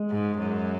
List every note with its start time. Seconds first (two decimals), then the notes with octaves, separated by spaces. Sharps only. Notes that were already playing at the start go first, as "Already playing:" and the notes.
Already playing: G#3
0.10 G#2
0.38 F#2